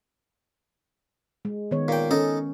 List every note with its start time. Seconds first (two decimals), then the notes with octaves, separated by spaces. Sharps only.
1.45 G#3
1.71 D#3 B3 C#5
1.88 A#2 G5
2.11 C#4 D#4 A4